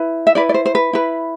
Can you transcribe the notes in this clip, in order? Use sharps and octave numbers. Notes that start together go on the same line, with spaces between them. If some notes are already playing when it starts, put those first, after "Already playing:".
Already playing: E4 B4
E5
E4 B4 D5
D5
C5
C5
B4
E4 B4